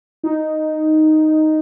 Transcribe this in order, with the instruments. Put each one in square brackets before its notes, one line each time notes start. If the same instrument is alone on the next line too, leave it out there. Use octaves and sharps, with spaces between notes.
[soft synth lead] D#4